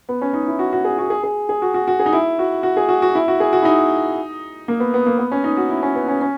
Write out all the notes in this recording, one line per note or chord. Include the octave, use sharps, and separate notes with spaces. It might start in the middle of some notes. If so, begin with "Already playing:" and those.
B3
C#4
D#4
E4
F#4
F#4
G#4
F#4
G#4
G#4
G#4
F#4
F#4
F#4
G#4
D#4
E4
F#4
F#4
G#4
F#4
F#4
E4
F#4
G#4
F#4
E4
D#4
A#3
B3
B3
A#3
B3
C#4
D#4
F#4
E4
C#4
B3
C#4
C#4